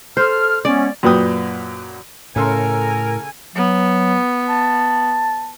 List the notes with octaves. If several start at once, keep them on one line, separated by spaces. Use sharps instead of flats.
A4 C5 F6
G#3 B3 C#4 D5
F#2 A#2 B4 G5 D#6
A2 C#3 A4 A#4 G#5 C6
F#3 B3
A5